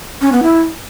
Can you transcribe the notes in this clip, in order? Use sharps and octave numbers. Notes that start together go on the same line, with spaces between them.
C#4
B3
E4